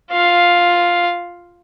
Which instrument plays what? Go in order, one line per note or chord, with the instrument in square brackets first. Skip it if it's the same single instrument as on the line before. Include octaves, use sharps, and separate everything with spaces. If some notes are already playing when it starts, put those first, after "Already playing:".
[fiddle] F4 F5